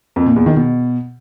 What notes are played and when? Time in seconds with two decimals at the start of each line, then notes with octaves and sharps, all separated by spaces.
0.16 F2
0.26 A#2
0.36 E2
0.46 D#3
0.56 B2